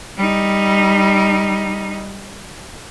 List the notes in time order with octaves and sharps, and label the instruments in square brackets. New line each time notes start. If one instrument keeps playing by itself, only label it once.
[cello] G3 D#4